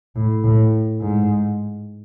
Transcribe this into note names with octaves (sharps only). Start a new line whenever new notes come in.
A2
A2
G#2